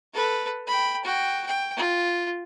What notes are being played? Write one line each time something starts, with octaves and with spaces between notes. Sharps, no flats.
A4 B4
G5 B5
F#4 G5
G5
F4